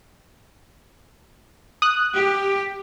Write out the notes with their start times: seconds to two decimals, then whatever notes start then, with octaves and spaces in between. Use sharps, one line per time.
1.82 D#6 F#6
2.13 G4